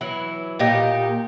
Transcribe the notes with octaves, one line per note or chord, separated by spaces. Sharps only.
E3 F#3 E4
A#2 D#4 G4